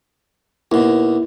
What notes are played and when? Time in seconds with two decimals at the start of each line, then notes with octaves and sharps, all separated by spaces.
0.72 D#2 B2 E4